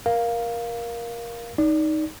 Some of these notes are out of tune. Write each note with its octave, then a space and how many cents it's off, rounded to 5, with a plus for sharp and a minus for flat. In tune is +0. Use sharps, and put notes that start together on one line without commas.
A#4 +15 F5 +0
D#4 +0 D5 -20